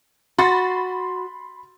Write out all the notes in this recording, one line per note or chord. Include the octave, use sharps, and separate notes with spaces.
F#4 B5 C6 A6